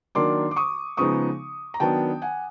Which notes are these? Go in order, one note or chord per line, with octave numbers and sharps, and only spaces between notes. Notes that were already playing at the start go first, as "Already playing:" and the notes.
D#3 F#3 A#3 D4 C6 D6
D6
C#6 D#6
C#3 F3 G#3 B3 D#4 C#6 D#6
A#5
D#3 F#3 B3 D4 G5 A5
F#5 G#5